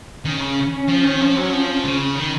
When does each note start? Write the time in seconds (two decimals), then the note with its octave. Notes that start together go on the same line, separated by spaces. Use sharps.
0.24 D#3 C#4
0.41 C#3
0.88 F3
1.04 D#3
1.21 F3
1.36 F#3
1.53 F3
1.84 C#3
2.16 D#3